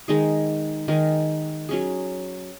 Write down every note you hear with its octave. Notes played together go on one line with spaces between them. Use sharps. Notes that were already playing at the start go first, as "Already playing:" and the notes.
D#3 G#3 D#4 G#4
D#3 G#3 D#4 G#4
F#3 C#4 G#4